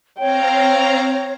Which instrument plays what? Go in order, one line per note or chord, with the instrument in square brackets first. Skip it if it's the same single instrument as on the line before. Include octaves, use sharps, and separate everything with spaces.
[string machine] C4 F5 A#5 [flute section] C#5 [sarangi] G5